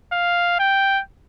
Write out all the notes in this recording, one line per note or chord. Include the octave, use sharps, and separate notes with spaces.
F5
G5